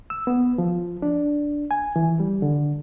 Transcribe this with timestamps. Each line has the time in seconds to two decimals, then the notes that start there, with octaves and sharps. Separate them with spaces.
0.10 E6
0.27 B3
0.58 F3
1.02 D4
1.71 G#5
1.96 E3
2.20 G3
2.42 D3